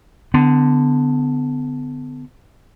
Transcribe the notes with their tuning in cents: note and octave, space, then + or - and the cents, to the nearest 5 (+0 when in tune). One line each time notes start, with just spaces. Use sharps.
D3 +0 B3 +30